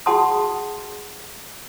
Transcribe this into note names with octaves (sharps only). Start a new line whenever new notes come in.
F#4 G#4 F#5 A5 C6 D#6